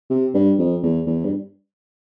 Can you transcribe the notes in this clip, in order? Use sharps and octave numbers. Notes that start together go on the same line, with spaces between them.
C3
G2
F2
E2
E2
G2